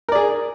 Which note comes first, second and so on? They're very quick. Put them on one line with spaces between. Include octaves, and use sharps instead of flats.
A#4 D5 G#4